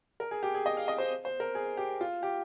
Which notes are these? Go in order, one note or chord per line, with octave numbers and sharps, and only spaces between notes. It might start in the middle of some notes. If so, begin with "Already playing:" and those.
A#4
G#4
G4
G#4
D#5
F5
D#5
C5
C5
A#4
G#4
G4
F4
G4